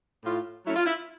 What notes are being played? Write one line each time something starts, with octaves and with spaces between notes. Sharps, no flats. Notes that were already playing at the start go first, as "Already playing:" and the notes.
A2 F4
F#3 A3 C#4 E4
F4
E4